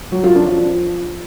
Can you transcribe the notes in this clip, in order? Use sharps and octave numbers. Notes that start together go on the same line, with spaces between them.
F#3
F4
D4
F3